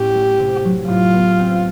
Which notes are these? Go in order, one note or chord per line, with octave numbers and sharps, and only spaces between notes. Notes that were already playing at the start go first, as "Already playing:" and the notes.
Already playing: A2 B3 C#4 G4
A3
C3
F#3
A2 F4
B3
C4